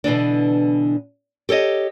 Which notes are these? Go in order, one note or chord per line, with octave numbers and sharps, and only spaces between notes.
B2 D3 E3 D4
G4 A4 C#5 D#5